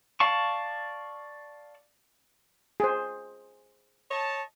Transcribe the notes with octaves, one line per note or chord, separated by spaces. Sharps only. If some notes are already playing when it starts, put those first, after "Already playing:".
D5 F5 A5 C#6
G#4 C5
C#5 D#5 A5